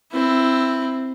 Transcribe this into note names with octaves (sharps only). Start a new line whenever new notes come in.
C4 E4